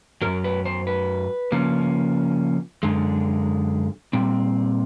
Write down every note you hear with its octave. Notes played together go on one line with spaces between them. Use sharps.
F#2 C#3 F#3 A#4
B4
C5
B4
C#3 F3 A#3 C#4
F#2 D3 G#3
A#2 G3 C4